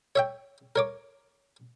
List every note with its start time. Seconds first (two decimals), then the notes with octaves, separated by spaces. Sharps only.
0.16 C#5 E5 G5
0.76 A#4 C#5 D6